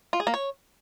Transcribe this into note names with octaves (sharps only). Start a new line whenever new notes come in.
F4
G#4
A#3
C#5